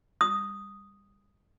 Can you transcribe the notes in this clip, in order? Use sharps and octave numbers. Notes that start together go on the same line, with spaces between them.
D#6